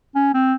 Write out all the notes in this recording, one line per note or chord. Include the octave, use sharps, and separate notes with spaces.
C#4
C4